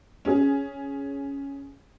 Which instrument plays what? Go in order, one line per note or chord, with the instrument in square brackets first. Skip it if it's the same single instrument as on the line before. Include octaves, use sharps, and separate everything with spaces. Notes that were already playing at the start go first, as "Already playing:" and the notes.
[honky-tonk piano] C#4 G#4